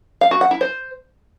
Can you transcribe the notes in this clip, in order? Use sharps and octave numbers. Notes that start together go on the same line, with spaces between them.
F5
F#4
F#5
E4
C5